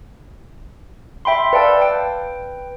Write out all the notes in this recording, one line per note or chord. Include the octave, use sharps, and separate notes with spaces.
E5 G5 B5 C6
B4 D5 F5 G5 A5 E6
B4 G5